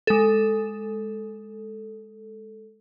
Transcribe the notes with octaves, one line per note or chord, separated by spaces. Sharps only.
G#3 A4